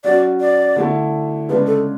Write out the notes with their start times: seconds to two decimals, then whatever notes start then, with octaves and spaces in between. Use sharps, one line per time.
0.04 F#3 C#4 F#4 D5
0.41 D5
0.76 D3 A3 E4
1.49 C#3 G#3 D4 B4
1.67 A4